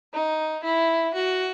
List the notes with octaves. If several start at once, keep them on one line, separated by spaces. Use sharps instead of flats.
D#4
E4
F#4